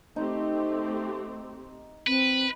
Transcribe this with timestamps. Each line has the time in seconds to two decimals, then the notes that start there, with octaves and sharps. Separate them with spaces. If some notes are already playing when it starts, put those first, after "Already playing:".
0.16 A3 C4 D#4 G4
2.07 C4 B4